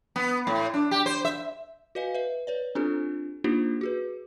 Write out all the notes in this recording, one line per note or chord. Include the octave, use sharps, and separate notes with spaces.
B3
A2
D4
G4
C5
E5
F#4 B4 D#5 F5 G#5
B4 E5
B4 C#5 D5
C4 D4 F4 G4 A4 C5
A#3 D4 D#4 F4 G4 C5
F#4 G#4 B4